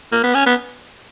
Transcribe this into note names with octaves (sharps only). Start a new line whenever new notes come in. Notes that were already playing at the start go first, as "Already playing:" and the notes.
A#3
B3
C#4
B3